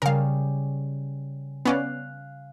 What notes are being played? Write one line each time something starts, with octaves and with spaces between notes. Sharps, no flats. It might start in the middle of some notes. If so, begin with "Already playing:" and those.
C#3 G3 A#4 F5
B3 C#4 D5 F5 F#6